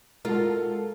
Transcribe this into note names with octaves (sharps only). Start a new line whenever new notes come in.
G#3 F4 F#4 A4 A#4